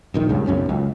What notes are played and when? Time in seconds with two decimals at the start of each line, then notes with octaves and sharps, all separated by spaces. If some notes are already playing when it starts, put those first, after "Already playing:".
0.14 D#1 A#1 D#3
0.29 C#2 G2 C#3
0.47 F#1 B1 F#2 C#4
0.69 C#2